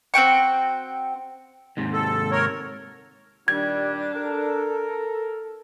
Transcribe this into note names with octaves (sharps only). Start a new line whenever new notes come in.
C4 F#4 G5 C#6
D#2 G#2 C3
A4
A#4 C#5
A#2 D#3 G3 D4 G#6
A4 A#4